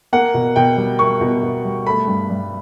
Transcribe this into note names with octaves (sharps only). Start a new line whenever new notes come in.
A#3 F#5
B2
B2 G5
G3
A#3 C#6
B2
B2
G3
A3 B5
G2
G2